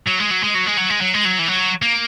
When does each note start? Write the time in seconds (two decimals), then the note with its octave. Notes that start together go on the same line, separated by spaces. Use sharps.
0.08 F#3
0.20 G#3
0.31 F#3
0.44 G#3
0.55 F#3
0.67 G#3
0.78 F#3
0.90 G#3
1.01 F#3
1.14 G#3
1.25 F#3
1.39 E3
1.48 F#3
1.82 A#3